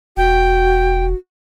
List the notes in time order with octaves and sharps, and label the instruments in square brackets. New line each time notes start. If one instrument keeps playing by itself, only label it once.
[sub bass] E1 [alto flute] F#4 [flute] G5